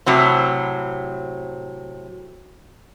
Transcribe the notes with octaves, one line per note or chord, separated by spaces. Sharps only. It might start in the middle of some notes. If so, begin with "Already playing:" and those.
A2 C3 F#3 C4